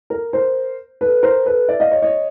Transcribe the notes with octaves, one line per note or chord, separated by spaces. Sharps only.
A#4
A#4 C5
A4 B4
A#4 C5
A4 B4
D5 E5
D#5 F5
C#5 D#5
C#5 D#5